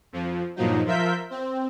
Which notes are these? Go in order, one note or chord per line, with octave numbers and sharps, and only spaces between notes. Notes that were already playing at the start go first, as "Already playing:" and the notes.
F2 F3
G2 A#2 F3 F#3 D#4
F3 F4 A#4 E5 G6 B6
C4